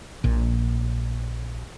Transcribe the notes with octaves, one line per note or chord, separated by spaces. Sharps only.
A#1 A#2